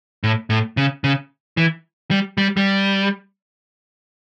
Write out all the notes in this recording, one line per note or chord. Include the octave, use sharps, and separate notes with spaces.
A2
A2
C#3
C#3
E3
G3
G3
G3